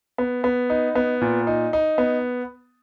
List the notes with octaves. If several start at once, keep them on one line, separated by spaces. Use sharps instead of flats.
B3
B3
D#4
B3
A#2
D#4
D#4
B3